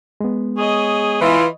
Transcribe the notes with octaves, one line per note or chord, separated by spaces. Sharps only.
G#3 B3
G#4 C#5 D#5
E3 F4